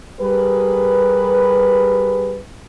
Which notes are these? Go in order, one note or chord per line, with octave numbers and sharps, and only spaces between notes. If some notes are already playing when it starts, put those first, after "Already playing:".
G3 G4 G#4 A#4 B4